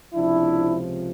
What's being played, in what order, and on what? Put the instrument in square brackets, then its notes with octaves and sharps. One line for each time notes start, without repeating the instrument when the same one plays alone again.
[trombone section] C#2 C3 F3 D4 E4